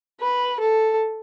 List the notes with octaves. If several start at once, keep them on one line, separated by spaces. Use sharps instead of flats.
B4
A4